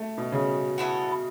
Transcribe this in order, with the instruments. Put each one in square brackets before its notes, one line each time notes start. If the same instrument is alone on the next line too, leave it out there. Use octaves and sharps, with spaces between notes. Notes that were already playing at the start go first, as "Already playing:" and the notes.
Already playing: [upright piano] A3
B2
C#3
[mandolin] B3 E4 A4 C#5